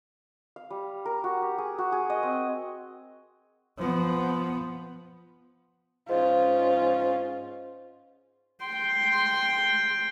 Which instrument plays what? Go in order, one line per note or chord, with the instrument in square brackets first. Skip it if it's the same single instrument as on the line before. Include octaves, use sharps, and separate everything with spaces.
[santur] F5
G3
A#4
F#4
G4
G#4
F#4
G#4
D#5
C4
[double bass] F3 B3
[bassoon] G#2 [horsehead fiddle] C#4 F4
[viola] G5 C6